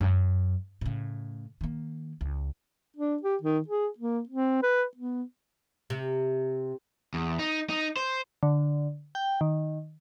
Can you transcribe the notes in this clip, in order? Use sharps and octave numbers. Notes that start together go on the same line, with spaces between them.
F#2
A2 C#3
D#3 A#3
C#2
D4
G4
D#3
G#4
A#3
C4
B4
B3
C3
E2
D#4
D#4
C5
D3
G5
D#3